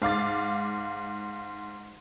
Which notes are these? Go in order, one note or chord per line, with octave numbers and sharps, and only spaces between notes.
G#2 F5 D6 A6